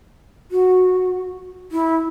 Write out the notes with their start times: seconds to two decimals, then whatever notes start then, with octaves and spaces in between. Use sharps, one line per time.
0.51 F#4
1.72 E4